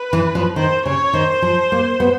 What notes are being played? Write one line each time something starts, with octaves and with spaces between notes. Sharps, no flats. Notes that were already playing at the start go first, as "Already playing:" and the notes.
Already playing: B4
E3
F3
D#3 C5
C#3 C#5
D#3 C5
F3
A#3
B3